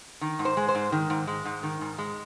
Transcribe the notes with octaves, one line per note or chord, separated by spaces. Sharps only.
D#3
G#2
C5
G#3
C5
G#2
D#3
G#2
G#3
G#2
D#3
G#2
G#3